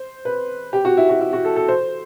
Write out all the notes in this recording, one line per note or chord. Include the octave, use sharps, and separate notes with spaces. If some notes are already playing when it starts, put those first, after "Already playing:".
Already playing: C5
B4
G4
F#4
E4
F#4
E4
F#4
A4
A4
C5